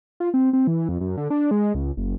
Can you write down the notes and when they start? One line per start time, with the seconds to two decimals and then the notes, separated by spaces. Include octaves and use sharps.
0.20 F4
0.34 C4
0.53 C4
0.67 E3
0.89 F2
1.01 F#2
1.17 D3
1.30 D4
1.51 G#3
1.75 C#2
1.97 F#1